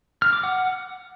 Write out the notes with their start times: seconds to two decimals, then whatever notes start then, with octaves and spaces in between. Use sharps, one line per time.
0.22 F6
0.33 D6
0.43 F#5